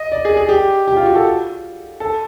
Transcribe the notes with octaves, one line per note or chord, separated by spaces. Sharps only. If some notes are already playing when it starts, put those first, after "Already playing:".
Already playing: D#5
D5
G#4
G#4
G4
G4
F4
F#4
A4
A4